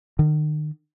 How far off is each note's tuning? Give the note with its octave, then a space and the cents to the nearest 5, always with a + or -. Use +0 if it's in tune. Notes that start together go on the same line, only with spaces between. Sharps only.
D#3 -40